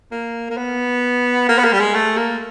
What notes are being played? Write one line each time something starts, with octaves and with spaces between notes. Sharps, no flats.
A#3
A#3
B3
A#3
B3
A#3
G3
G#3
A3
A#3